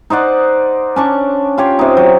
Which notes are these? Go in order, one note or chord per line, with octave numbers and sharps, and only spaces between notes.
D#4 C5 D5 F#5
C#4 D4 C#6
F4 G4 C#5
C3 D#4
F#3